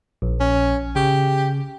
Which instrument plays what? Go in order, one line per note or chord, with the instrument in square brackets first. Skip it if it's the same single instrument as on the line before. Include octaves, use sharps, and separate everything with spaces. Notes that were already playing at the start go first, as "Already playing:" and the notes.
[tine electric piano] A#1
[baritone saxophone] C#4
[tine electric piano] C#3 [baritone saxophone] G4